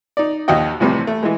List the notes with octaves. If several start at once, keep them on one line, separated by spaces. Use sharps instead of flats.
D#4 D5
A#1 D#2 F#4 D#5 G5
C2 A2 C3 E3 F3 G3
A3
E3 G#3